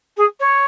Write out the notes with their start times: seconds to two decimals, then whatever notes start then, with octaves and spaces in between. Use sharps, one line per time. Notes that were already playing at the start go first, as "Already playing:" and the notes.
0.17 G#4
0.40 C#5